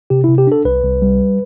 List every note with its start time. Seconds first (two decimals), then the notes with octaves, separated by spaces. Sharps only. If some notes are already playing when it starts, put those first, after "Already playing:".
0.10 C3 G4
0.24 C3 E4
0.38 G4
0.47 D4 A4
0.65 C2 B4
0.84 C2
1.02 G3